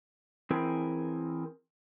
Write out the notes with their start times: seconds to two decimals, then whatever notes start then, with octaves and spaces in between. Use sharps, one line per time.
0.50 E3 C4 E4 G#4 A#4